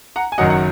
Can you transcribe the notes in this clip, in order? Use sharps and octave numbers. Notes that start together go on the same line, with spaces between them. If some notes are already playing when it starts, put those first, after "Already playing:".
F#5 A#5
G#5
F#1 F#2 D#3 F#3 D#5 F#5
F#5